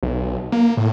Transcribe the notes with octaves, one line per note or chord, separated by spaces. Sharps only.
B1
A#3
A2